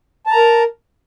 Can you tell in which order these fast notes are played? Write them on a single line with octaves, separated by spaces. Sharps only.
A5 A#5 A#4